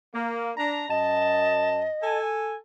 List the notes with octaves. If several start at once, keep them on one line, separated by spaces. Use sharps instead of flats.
A#3
D4 A#5
F#2 D#5 A5
A4 G#5